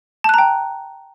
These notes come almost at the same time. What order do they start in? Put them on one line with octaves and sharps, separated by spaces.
A5 F#6 A#5 G5